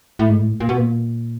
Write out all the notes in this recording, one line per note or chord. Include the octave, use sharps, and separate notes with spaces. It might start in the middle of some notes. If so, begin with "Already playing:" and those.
A2
G#2
A2
A#2
B2
A#2